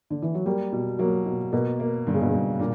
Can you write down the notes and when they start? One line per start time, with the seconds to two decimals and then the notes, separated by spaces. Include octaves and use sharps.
0.10 D3
0.22 E3
0.34 F#3
0.46 G3 A#3
0.72 B2
0.99 F#3 A#3
1.26 B2
1.52 B2 A#3
1.80 A#3
2.07 G2 D3
2.14 C#3
2.22 B2
2.30 G2 C#3
2.59 A#2 D3